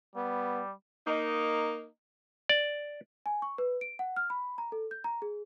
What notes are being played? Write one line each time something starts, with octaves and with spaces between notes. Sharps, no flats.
G3 B3
A#3 D#4
D5
G#5
C#6
B4
D7
F#5
F6
B5
A#5
A4
G6
A#5
G#4